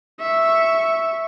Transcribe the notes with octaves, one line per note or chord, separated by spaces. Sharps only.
E5 C#6